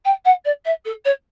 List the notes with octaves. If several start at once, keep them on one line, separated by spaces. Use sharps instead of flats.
G5
F#5
D5
E5
A4
C#5